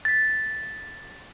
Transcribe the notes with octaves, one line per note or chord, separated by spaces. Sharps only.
A6 B6